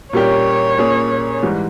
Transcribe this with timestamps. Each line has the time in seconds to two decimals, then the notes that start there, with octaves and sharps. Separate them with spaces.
0.13 A#2 G3 A#3 C#4 G4 C#5
0.78 A#2 A#3 C#4 G#4
1.43 G#2 E3 G3